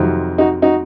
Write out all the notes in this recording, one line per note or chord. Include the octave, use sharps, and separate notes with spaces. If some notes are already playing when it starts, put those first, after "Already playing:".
Already playing: F2 C3 D#3 F#3
D#4 F#4
D#4 F#4